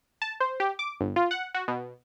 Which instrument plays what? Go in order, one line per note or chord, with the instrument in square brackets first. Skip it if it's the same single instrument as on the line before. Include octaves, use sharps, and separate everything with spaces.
[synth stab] A5
C5
G4
D6
G1
F4
F#5
F#4
B2